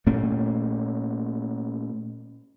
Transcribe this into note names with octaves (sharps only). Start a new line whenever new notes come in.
A#2 A3 A#3 C#4